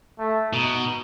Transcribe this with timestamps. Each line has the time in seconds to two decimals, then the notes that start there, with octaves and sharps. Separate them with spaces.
0.19 A3
0.53 B2 D#4